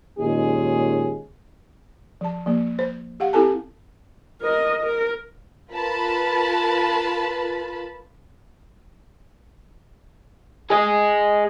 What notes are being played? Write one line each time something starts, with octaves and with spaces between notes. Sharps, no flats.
D#2 A#2 G#3 C#4 D#4 G#4
F3 A5
F3 A#3
C5
G4 F5 F#5
C4 E4 G4 A4 G#5 A5
A#4 D#5
A#4
F4 A#4 B4 A5 B5
G#4 D#5